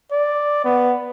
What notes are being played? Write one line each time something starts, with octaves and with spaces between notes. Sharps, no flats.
D5
B3